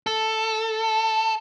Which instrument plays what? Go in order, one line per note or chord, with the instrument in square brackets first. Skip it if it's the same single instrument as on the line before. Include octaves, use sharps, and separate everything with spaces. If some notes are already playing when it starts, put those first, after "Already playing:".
[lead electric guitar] A4